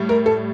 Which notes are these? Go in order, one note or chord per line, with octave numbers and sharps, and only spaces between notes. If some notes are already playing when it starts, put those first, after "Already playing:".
Already playing: A2 G3
A#4
A4